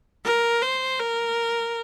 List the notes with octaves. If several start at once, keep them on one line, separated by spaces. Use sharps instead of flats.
A#4
C5
A#4